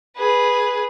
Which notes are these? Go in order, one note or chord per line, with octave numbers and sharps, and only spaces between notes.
G#4 B4